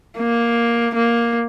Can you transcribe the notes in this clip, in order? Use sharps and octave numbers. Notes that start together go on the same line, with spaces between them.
A#3
A#3